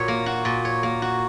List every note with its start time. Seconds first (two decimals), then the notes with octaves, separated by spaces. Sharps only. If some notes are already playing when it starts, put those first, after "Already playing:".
Already playing: A#2 F#4 C#5
0.08 A#3
0.26 F#4
0.45 A#2
0.65 C#5
0.83 A#3
1.02 F#4